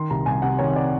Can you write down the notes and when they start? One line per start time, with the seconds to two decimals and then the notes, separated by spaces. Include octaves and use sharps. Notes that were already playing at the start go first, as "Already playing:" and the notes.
Already playing: D#3 C6
0.10 C2 A#5
0.26 C2 G#5
0.42 C3 F#5
0.59 D#3 C#5
0.76 D5